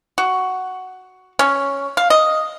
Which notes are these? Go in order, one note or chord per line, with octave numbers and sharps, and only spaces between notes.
F#4
C#4
F5
D#5